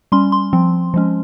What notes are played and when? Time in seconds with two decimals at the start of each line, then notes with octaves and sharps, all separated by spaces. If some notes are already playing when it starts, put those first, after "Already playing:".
0.12 G3 C#4 C6
0.32 C6
0.53 F3 C4
0.94 F3 G#3 C#4